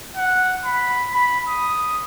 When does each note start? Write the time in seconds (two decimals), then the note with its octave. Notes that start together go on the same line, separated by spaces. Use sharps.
0.17 F#5
0.65 B5
1.13 B5
1.48 D#6